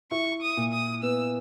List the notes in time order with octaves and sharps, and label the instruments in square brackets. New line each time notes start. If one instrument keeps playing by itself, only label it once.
[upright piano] E4 [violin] C#6
[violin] D#6
[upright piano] A#2
[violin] D#6
[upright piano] B3 [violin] E6